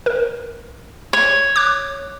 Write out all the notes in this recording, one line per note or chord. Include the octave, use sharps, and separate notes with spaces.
A#4
C#5
D6 F#6